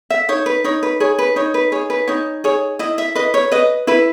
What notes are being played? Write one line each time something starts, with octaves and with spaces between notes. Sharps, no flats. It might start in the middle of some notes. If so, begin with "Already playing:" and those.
E5
D#4 C#5
B4
D#4 C#5
B4
G#4 C#5
B4
D#4 C#5
B4
G#4 C#5
B4
D#4 C#5
G#4 C#5
E4 D#5
E5
B4 D#5
C#5
B4 D#5
E4 B4